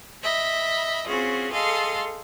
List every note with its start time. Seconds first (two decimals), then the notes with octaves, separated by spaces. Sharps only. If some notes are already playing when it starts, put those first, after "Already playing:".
0.22 D#5 E5 B5
1.07 C4 C#4 F4 F#4 G#4
1.52 G#4 A4 D#5 F5 C6